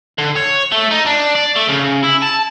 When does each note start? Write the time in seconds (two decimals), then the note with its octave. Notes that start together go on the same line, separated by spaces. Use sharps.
0.18 D3
0.36 C#5
0.72 A3
0.91 D#4
1.06 D4
1.35 D5
1.56 A3
1.68 C#3
2.03 E4
2.22 A5